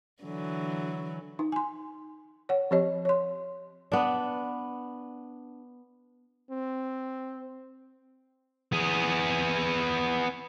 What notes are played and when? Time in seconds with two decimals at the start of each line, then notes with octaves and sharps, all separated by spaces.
0.23 D3 E3 F#3
1.39 D#4
1.52 G#5 C6
2.49 C#5 F#5
2.71 F3 C4 G4 C#5 D#5
3.05 C#5 C6
3.92 B3 D4
6.50 C4
8.72 B3 G#4